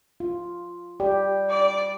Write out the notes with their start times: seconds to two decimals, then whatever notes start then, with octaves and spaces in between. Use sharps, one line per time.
0.20 F4
1.00 G3 G4
1.49 D5 D6